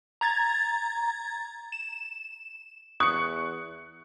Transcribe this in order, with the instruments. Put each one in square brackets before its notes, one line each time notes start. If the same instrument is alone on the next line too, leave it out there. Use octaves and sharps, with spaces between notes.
[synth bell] A#5 G#6 A6
E7
[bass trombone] E2 [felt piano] C#6 [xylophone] D#6 [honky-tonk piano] F#6 C#7